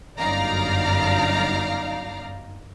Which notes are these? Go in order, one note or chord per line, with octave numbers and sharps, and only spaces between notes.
G1 F#2 D#4 D5 F5 A#5